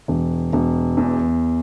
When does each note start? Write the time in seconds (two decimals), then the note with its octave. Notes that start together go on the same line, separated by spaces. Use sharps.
0.08 E1
0.53 E1
0.97 E2